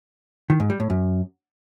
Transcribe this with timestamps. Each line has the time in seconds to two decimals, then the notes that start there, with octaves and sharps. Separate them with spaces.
0.50 D#3
0.60 G#2
0.70 G3
0.80 A2
0.90 F#2